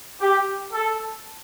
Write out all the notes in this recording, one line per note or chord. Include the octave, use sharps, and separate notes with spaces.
G4
A4